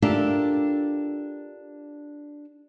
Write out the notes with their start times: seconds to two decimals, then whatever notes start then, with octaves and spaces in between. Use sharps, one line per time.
0.02 D4 F4 G4 A4 A#4 E5